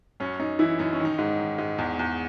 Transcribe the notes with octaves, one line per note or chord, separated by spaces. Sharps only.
F#2 C#4
F#2 D#4
E3 E4
F#2 D#4
C#4
D#3
D#4
G#2
D#3
G#2
E2
E2